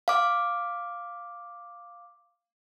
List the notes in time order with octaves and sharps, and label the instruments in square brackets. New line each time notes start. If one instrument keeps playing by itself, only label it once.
[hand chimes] F5 D6